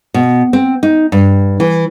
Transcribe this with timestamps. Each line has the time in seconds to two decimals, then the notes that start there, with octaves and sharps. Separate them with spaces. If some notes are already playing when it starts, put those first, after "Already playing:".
0.14 B2
0.53 C4
0.83 D#4
1.12 G2
1.60 E3